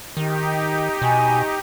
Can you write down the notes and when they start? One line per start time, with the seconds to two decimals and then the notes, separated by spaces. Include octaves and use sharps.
0.17 D#3 D#4 G4
1.02 B2 D#5 G#5 C#6